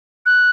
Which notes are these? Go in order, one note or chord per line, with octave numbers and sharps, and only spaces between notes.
F#6